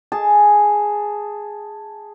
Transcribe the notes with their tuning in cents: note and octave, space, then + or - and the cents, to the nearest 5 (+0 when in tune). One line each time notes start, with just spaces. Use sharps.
G#4 +0 A5 +0